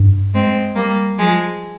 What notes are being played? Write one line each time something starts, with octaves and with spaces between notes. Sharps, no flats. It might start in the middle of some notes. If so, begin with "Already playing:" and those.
Already playing: G2
G#3 C4
G3 A#3
F3 G#3